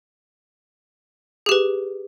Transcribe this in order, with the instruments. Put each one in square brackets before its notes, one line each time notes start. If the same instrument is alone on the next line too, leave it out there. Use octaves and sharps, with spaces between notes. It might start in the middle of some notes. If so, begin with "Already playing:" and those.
[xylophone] G#4
G4
B4